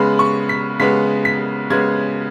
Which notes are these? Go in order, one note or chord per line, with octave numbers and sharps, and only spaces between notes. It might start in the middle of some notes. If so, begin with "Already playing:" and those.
Already playing: C#3 G#3 B3 B5
C#6
B6
C#3 G#3 B3 B6
B6
C#3 G#3 B3 G#6